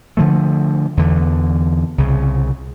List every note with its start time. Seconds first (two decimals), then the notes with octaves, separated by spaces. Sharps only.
0.17 D3 F3 A3
0.97 E2 D3
1.98 C2 C#3